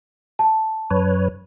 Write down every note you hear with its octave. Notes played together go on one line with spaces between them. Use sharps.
A5
F#2 B4 C#5